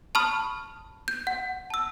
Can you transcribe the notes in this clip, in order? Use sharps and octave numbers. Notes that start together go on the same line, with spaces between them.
A5 B5 C#6 D#6 F6
G6
F#5
A5 E6